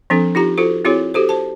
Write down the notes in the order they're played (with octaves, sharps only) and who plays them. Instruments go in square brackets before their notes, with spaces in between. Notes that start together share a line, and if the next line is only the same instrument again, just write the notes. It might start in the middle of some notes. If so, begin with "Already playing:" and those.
[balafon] F3 C4 D4 A4
D#4 F4 G4 A#5
F4 F#4 A4 C5
C4 E4 F#4 G#4 C#5
F#4 G4 A4 C5
C5 A5